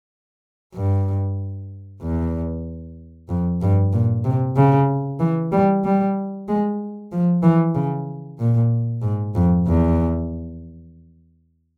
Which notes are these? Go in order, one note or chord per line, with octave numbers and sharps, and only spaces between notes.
G2
E2
F2
G2
A#2
C3
C#3
E3
G3
G3
G#3
F3
E3
C#3
A#2
G#2
F2
E2